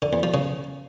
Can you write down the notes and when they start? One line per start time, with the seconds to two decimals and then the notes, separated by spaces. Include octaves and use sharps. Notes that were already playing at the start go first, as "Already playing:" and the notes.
0.02 D3
0.13 E2
0.23 F3
0.34 C#3